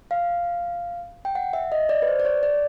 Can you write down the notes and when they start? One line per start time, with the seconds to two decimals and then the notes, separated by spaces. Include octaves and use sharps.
0.11 F5
1.25 G5
1.35 F#5
1.53 E5
1.72 D#5
1.89 D5
2.02 B4
2.07 C5
2.20 D5
2.25 C#5
2.43 D5